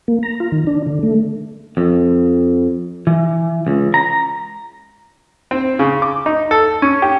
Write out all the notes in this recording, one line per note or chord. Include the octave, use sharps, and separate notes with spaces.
A#3
A#5
F4
D#3
D4
D3
A3
F2
E3
C#2
A#5
C4
C#3
D6
D#4
A4
C#4
G4